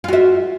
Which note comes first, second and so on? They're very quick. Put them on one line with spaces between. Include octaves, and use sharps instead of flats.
F4 F#4 E5